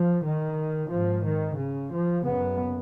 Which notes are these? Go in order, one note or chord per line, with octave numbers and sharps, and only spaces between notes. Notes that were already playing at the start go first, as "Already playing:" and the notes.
Already playing: F3
D#3
G#1 G#2 F3
D#3
C#3
F3
F#1 F#2 C#3 B3